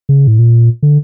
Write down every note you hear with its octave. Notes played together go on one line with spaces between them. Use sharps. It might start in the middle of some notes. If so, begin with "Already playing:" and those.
C#3
A2
A#2
D3